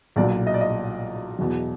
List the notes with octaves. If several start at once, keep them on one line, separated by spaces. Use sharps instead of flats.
B1 A#2 F#3 D5
D#5
D5
D#5
E2 B2 F#3